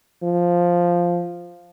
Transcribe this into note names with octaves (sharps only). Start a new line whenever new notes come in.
F3